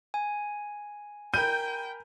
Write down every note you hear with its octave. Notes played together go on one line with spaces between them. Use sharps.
G#5
A#4 G5 B5 G6 D#7